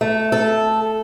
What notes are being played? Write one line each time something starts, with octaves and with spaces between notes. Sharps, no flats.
A3
A4